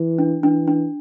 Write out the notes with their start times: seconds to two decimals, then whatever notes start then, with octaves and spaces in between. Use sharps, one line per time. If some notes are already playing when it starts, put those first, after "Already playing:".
Already playing: E3
0.18 D4
0.43 E3 D4
0.67 D4